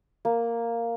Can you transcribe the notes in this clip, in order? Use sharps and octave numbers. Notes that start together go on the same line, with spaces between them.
A#3